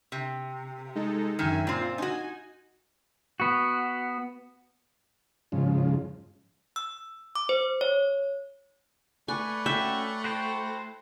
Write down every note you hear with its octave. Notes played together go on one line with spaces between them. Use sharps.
C3
G#3 D#4 A4
F#2 D#3 E5 G#5
A#2 C4 F4
D#4 F#4 G#5
B3 F#4
G#2 C#3 F3
E6
D6
C5
C#5
A3 B4 D5 G#5 C#6
C#4 F#4 E5 G5
E4 F#4 C5 G5